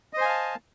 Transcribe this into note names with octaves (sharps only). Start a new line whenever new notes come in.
C5 D#5 F5 G#5 A5